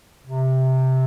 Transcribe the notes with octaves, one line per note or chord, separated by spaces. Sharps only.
C3